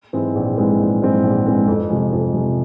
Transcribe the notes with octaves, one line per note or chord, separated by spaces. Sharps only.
G#2 E3 G#3 C4
A#1
G#2 E3 G#3 C4
A#1
G#2 E3 G#3 C4
A#1
G#2 E3 G#3 C4
F2
C3 F3 G#3
F2
C3 F3 G#3